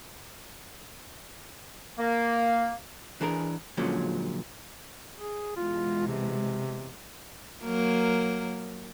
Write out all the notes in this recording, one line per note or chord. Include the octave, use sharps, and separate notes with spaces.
A#3
E3 D4 G#4 A#4
A#2 D3 F3 F#3 G#3 C#4
G#4
B2 E3 G#3 F4
C3
F#3 A#3 A#4